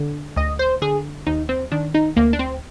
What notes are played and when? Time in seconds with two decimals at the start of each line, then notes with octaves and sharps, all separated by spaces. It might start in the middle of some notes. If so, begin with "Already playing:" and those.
Already playing: D3
0.36 D2 D#5
0.59 C5
0.82 D3 G#4
1.27 D#2 D#4
1.49 C4
1.72 D#3 D4
1.94 D#4
2.16 D2 A#3
2.33 D4
2.39 C4